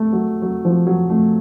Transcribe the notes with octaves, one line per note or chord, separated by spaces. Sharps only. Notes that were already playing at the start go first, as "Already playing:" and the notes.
Already playing: A3
F#3
F#3
F3
F#3
A3